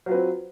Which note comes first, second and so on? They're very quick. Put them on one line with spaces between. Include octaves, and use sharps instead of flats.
F#3 F4 B4 C4